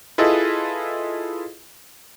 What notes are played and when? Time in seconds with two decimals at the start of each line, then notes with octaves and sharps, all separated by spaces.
0.18 E4 F4 G#4 A4 B4 D#5